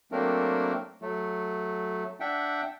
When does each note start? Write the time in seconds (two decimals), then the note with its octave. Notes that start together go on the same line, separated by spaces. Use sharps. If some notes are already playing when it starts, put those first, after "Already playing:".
0.12 F#3 A3 A#3 C4 D4 A#4
1.02 F#3 A3
2.20 D4 E5 F#5 G5